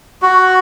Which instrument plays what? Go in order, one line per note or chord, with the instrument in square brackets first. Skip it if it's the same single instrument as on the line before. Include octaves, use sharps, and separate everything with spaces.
[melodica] F#4